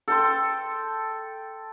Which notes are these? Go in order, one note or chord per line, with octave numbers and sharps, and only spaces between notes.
A4 G5 C6